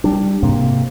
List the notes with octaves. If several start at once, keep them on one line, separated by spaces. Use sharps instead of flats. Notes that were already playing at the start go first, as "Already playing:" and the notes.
G3 D4
G#2 C3 A#3 C4